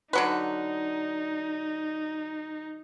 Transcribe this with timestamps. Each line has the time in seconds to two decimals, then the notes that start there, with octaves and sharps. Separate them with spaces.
0.13 D3 F#3 D#4 B4